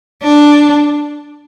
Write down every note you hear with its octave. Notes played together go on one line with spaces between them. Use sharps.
D4